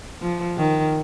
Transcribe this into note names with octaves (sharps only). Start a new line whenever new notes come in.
F3
D#3